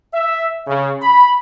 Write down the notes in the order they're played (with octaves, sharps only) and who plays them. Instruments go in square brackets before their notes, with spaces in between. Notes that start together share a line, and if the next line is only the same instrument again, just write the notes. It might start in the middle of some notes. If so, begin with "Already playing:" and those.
[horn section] E5
C#3
B5